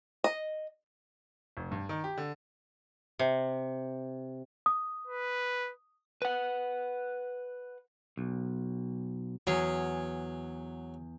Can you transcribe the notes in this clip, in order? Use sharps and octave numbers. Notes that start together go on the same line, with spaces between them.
D#5
F1
G2
D#3
G4
D3
C3
D#6
B4
B4 F#5
B1
E2 F#3 G#4